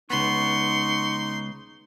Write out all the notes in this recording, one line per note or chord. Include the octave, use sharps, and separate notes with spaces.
C#2 B3 D#4 C6 C#6